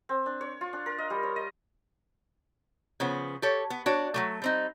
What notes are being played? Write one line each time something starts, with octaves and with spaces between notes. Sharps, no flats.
C4
D4
C#5
F4
D4
A#4
D#5
G3
C#5
D#5
C#3 F3 B3
G4 A4 C#5
B3
D4 F#4 C#5 D5
F#3 G3 A3
G3 C4 D#4